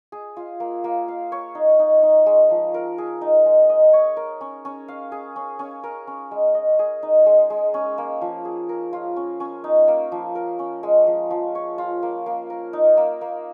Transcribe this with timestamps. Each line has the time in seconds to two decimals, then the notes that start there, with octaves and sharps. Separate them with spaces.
0.12 G#4
0.37 F4
0.60 A#3
0.84 A#3
1.08 F5
1.32 C#5
1.55 D#4
1.79 D#4
2.03 D#4
2.26 G#3
2.51 F3
2.74 A#4
2.98 G#4
3.21 D#4
3.46 G#3
3.69 D#5
3.93 C#5
4.17 A#4
4.41 C#4
4.65 C#4
4.88 F5
5.12 G#4
5.36 C#4
5.59 C#4
5.84 A#4
6.07 C#4
6.31 G#3
6.54 D#5
6.79 G#4
7.03 D#4
7.26 G#3
7.50 G#3
7.74 C#4
7.98 A#3
8.21 F3
8.45 G#4
8.69 A#4
8.93 F4
9.16 C#4
9.40 C#4
9.64 D#4
9.88 A#3
10.12 F3
10.35 A#4
10.59 C#4
10.83 G#3
11.07 F3
11.31 F3
11.55 C#5
11.78 F4
12.03 A#3
12.26 A#3
12.50 A#4
12.73 D#4
12.97 A#3
13.21 A#3